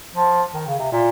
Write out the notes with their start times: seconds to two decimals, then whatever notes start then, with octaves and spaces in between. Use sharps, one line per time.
0.15 F3
0.54 D#3
0.67 C#3
0.79 C3
0.92 A#2